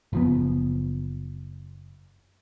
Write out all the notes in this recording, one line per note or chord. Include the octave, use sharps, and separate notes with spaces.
F#1 F3 B3